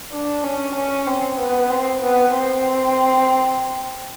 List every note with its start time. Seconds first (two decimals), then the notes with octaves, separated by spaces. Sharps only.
0.12 D4
0.43 C#4
0.75 C#4
1.07 C4
1.39 B3
1.70 C4
2.02 B3
2.33 C4